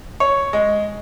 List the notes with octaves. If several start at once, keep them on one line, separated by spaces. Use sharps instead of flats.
C#5
G#3